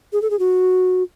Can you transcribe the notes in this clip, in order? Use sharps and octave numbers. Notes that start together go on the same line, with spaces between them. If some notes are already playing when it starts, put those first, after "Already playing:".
G#4
A4
G#4
F#4